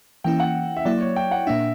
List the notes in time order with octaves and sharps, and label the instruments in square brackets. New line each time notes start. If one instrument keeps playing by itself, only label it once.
[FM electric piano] E3 A#3 C#4 E4 [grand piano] G5
[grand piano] F#5
E5
[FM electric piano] F#3 A#3 E4 [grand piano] D5
[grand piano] C#5
G5
F#5
[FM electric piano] A#2 A#3 D4 [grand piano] E5